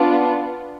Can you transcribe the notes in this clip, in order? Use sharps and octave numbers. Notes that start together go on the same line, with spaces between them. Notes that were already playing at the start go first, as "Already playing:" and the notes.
Already playing: B3 D4 F4